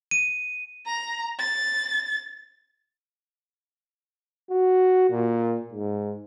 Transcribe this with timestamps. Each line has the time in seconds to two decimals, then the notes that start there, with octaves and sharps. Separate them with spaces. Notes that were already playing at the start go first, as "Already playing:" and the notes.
0.11 D#7
0.86 A#5
1.39 A6
4.51 F#4
5.10 A#2
5.73 G#2